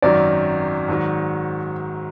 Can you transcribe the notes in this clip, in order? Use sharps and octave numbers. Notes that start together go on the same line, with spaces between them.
G#1 F#2 D#3 F#3 D5
G#2 D#3 F#3